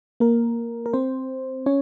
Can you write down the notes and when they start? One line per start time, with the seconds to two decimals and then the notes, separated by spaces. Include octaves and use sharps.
0.20 A#3 A#4
0.86 A#4
0.93 C4 C5
1.66 C#4 C#5